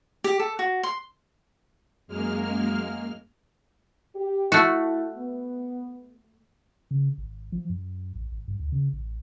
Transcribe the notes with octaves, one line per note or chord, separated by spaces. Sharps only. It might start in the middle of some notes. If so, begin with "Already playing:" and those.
G4
A4
F#4
C6
F#2 G#3 A#3 F6
G4
A3 E4 F#4 A4
B3
C#3
G#1
F3
F#2
A1
G#1
G2
D2
C#3
A1